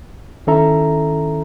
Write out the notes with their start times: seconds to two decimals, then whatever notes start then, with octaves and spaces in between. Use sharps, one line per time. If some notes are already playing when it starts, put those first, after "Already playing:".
0.47 D#3 C#4 E4 A4 E5 A#5